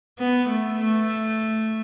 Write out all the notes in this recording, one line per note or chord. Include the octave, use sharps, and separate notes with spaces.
B3
A3
A3